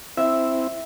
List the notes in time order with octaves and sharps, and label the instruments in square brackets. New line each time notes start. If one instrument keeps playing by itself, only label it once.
[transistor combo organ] C4 E4 [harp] E5